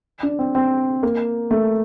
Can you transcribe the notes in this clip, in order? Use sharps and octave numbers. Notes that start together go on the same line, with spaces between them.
D4
C4
C4
A#3
A3